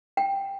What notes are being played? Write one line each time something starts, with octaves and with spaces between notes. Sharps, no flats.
G5